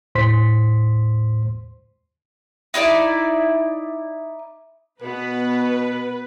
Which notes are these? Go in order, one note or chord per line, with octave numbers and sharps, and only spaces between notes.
D#2 A2 C5 C6 B6
D#4 E4 A4 D5
B2 B3 B4